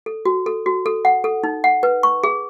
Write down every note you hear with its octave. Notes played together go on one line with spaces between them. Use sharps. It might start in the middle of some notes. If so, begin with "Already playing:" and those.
A4
F#4
A4
F#4
A4
F#5
A4
D#4
F#5
B4
C#6
G#4